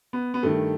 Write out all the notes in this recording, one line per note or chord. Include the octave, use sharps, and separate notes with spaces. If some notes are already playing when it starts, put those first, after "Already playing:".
B3
B3
G2 D#3 A3